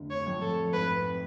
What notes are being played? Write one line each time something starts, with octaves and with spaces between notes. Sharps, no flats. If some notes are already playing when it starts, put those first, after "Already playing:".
Already playing: F1 D3
C#5
F2
A4
G#1 B4